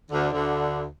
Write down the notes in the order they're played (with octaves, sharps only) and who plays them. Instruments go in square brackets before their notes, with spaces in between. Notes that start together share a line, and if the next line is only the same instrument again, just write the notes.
[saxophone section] D2 D3
D2 D3